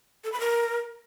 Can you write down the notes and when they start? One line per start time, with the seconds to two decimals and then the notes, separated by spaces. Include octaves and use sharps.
0.24 A4
0.32 B5
0.40 A#4